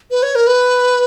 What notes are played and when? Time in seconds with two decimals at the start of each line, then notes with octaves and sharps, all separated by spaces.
0.11 B4
0.23 C#5
0.35 A#4
0.47 B4